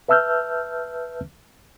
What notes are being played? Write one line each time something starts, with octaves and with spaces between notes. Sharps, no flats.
B4 E5 A5 E6 F6 G6